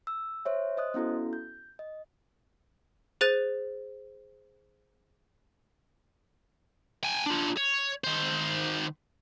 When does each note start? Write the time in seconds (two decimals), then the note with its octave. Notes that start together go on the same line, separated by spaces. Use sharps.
0.07 E6
0.45 C5 C#5 E5
0.77 C5 D#5 D#6 F#6
0.94 B3 C#4 E4 F#4 A4
1.33 G6
1.79 D#5
3.21 G#4 C5 F#6 A6 D#7
7.03 G5 G#5
7.26 D4 F4
7.57 C#5
8.04 D#3 C5